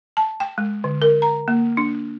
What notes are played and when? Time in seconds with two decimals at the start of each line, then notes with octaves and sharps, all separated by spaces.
0.17 A5
0.40 G5
0.58 G#3
0.84 D3
1.02 A#4
1.22 A#5
1.48 A#3
1.77 D4